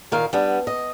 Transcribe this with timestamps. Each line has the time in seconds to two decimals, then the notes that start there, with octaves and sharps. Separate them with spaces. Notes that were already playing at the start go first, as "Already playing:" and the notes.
0.12 A#2 D#3 A#4 F5
0.33 G3 B3 D4
0.67 D#5